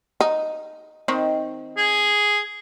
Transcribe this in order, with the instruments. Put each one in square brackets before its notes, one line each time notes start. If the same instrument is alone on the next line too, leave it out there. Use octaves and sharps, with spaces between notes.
[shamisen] D#4
D#3 C4 D#4
[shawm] G#4